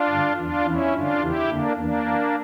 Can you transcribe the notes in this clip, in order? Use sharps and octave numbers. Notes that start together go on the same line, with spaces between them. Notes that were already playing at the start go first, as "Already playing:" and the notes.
Already playing: D4 F4
G2 D3
E2 E3 D4 F4
E2 E3 C#4 E4
G2 D3 D4 F4
E2 C#3 E3 E4 G4
F2 D3 A#3 D4
E2 E3 A#3 D4
F2 E3